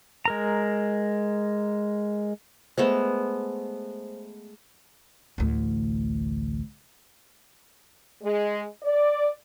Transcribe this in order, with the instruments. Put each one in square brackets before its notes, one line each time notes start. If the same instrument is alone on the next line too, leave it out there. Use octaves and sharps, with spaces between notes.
[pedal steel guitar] G#3 A#4 A#5
[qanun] G#3 A3 B3 [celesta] C5
[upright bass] A1 D2
[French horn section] G#3
D5